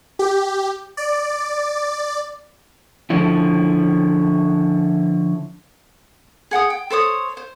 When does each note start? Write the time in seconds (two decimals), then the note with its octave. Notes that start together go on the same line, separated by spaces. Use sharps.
0.19 G4
0.97 D5
3.10 D3 F3 C#4 E4
6.51 G#4 F#5 G5 D#6
6.70 G5
6.90 A4 C5 C#5 D#6
7.37 C5